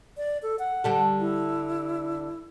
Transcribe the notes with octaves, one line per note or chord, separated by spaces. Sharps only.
D5
A4
F#5
D3 G3 A4
E4